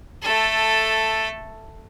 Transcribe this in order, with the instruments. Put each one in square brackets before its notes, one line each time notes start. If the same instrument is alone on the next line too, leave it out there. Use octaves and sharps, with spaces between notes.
[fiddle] A3 A4